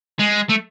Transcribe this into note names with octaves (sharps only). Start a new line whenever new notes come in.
G#3
A3